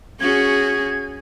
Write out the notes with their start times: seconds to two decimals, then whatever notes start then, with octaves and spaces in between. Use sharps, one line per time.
0.20 C#4 F#4 G#4 G#6